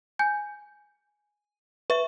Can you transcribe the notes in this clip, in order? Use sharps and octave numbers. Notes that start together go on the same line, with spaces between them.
G#5 G6
B4 E5 C#6